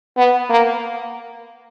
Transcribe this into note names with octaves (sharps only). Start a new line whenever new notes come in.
B3
A#3